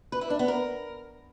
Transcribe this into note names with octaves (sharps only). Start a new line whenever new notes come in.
B4
E4
D4
B3
A#4